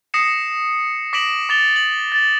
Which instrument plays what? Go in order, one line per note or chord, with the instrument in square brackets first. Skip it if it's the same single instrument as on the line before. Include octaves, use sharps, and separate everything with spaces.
[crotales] D#6 A#6 C7 C#7 E7
D6 A#6 B6 D7 E7 F#7
D6 A6 F7 G7
F#7
A6